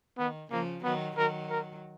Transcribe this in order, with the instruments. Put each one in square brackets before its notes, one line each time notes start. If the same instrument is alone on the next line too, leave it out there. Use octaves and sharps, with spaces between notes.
[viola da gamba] D#3 [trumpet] B3
[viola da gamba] C#3 F3 [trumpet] A#3
[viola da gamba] D#3 F#3 [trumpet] B3
[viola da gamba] D#3 F#3 [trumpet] A#4
[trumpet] A#4